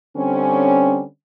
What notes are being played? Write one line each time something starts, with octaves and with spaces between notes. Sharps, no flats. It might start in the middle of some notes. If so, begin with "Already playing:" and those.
D3 G3 C4 C#4